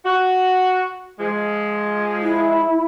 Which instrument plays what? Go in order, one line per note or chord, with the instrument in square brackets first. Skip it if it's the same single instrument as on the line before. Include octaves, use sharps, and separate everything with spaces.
[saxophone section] F#4
F3 G#3
[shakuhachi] E4